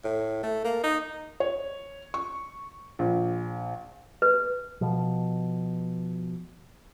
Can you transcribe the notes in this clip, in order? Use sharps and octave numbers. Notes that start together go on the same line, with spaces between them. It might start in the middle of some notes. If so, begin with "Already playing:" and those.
A2
A3
A#3
D#4
C#5
C#6
A#1
B4
B2 F3